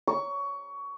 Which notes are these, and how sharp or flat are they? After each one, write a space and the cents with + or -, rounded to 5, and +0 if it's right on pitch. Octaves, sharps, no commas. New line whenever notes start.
C#6 +20